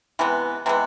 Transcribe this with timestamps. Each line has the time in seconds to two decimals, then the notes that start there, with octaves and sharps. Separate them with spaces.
0.19 C3 E3 G#3 B3
0.66 C3 E3 G#3 B3